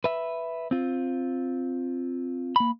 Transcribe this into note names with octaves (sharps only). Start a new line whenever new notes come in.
B4 E5
C4 F4
A#3 B5